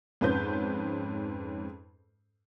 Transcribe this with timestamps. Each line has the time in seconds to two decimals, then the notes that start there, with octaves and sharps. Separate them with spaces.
0.21 F2 G#2 C#4 B4 C5 G6